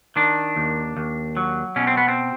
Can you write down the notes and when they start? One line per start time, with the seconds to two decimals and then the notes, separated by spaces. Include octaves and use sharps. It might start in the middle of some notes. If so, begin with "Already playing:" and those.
0.16 D#3 D4
0.56 D#2
0.97 D#2
1.37 F#3
1.76 B2 C#4
1.87 C4
1.97 B3
2.08 C4